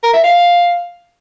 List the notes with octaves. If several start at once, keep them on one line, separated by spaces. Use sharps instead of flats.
A#4
E5
F5